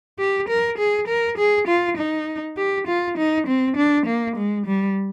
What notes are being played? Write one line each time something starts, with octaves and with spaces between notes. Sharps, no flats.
G4
A#4
G#4
A#4
G#4
F4
D#4
G4
F4
D#4
C4
D4
A#3
G#3
G3